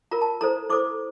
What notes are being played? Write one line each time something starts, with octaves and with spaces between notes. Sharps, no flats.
F4 A#4 A#5
A5
E4 A4 C5 A#5
E4 A4 C5 D6